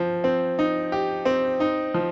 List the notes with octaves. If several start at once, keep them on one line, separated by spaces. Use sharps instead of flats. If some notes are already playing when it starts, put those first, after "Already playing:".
Already playing: F3 C4
C4
D#4
G4
C4
D#4
F3